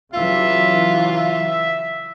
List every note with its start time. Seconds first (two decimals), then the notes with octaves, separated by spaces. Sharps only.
0.14 C#3 E3 F#3 F4 E5
1.16 E5